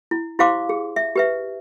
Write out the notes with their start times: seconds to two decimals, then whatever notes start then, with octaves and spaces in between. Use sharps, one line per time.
0.11 E4
0.39 E4 G4 C5 F5 C6 D6
0.69 G#4
0.96 E5
1.16 G4 B4 E5